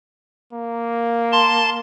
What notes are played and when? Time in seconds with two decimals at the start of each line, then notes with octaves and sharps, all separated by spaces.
0.53 A#3
1.32 A5 C6